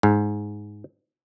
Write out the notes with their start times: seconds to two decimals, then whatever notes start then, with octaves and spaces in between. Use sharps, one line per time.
0.03 G#2